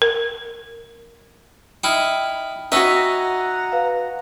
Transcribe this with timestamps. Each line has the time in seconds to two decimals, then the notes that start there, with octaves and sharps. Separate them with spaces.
0.02 A#4
1.84 D#4 E4 G5 B5 F6
2.72 C#4 D#4 F#4 E5 F#5 A#5
3.72 B4 F5